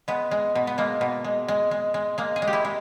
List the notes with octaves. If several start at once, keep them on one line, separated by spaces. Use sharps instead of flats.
G#3 B3
G#3
B2
B3
G#3 A#3
B2
G#3
G#3
G#3
G#3
G#3 A#3
G#4
G#3
G4
E4
G#3